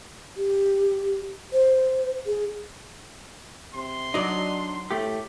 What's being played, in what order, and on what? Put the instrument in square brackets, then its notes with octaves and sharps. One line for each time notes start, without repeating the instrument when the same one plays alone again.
[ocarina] G4
C5
G#4
[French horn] C3 [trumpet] C6
[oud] F#3 D5 [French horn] D4 [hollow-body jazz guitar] D#4
[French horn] A2 [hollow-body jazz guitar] A3 G4